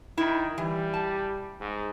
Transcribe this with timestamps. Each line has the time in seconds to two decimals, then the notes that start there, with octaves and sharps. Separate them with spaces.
0.18 D#3 E4
0.58 E3 G3
0.94 A5
1.60 G#2